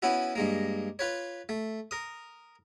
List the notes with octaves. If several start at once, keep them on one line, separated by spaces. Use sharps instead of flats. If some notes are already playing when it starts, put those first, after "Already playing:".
B3 C#4 E4 F#4
G2 G#3 A#3
F4 B4 C#5
A3
A#4 D#6